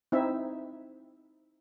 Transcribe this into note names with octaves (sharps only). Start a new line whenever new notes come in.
C4 D#4 E4 E5